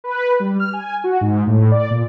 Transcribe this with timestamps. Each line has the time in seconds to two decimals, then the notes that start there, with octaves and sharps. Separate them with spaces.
0.04 B4
0.40 G3
0.59 F6
0.73 G#5
1.04 F#4
1.21 G#2
1.47 A2
1.71 D5
1.90 A#2